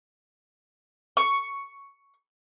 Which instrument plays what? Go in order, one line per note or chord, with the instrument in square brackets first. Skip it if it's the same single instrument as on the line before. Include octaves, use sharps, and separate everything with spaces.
[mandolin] C#6